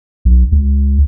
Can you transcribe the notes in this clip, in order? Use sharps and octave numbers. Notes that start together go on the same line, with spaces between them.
B1
C#2